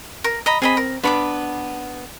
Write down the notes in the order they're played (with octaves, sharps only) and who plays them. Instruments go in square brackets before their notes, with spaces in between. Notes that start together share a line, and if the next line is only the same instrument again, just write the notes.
[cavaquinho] A#4
D#5 A#5 B5
[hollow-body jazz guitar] C4 [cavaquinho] G#4 D#5 B5
[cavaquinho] A#4
[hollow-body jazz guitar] B3 D4 B4 [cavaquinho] B5 C#6 D6